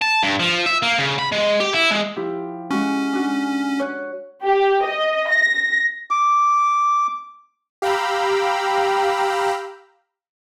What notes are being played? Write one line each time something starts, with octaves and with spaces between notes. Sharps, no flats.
A5
G2
F3
E5
A#3
C#3
B5
G#3
G4
E4
G#3
F3 E4 G4
G#3 C#4 F#4 C#6
D4 F#4
C#5 F#6
G4
D#5
A#6
D6
G4 F5 G5 A#5 B5 E6